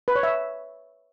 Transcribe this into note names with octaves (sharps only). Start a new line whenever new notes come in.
B4
C#5
E5